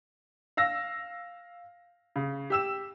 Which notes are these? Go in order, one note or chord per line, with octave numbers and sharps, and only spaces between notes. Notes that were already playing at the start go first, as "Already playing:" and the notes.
F5 E6 A#6
C#3
G4 E6 E7